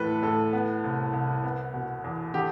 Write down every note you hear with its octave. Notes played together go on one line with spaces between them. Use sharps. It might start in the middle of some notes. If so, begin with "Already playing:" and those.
Already playing: D2 A2 E3 A4 B4
A2 A4
B3
C2
C2
B3
B2
E2
D3 G4